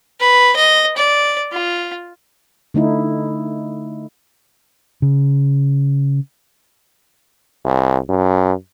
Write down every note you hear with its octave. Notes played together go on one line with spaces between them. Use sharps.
B4
D#5
D5
F4
D3 A3 D#4 E4
C#3
C2
F#2